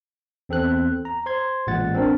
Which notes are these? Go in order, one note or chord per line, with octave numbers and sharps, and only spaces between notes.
E2 C4 A4 F#6
A#5
C5 C6 G#6
A1 A#2 G#3 F#5 A6
C4 D4 A#4